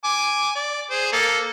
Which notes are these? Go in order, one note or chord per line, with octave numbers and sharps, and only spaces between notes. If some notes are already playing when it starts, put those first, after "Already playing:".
G#5 D6
D5
G#4 C5
A#3 A4